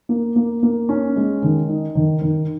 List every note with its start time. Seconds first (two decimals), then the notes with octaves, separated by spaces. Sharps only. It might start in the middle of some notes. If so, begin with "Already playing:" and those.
0.09 A#3
0.36 A#3
0.63 A#3
0.89 C#4
1.16 G#3
1.42 D#3
1.69 D#4
1.95 D#3
2.22 D#3